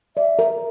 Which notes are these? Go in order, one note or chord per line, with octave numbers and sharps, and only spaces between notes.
D5 E5
A#4